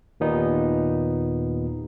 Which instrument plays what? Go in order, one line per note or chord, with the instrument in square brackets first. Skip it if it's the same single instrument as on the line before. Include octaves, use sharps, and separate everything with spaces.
[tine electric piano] D#2 A#2 B3 D#4